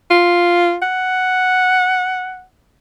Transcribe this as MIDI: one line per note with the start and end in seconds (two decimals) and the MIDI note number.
0.11 0.77 65
0.82 2.44 78